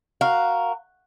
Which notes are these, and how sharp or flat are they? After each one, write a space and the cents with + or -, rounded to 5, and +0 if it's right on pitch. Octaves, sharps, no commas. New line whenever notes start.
F#4 +0 A#4 +0 F5 +0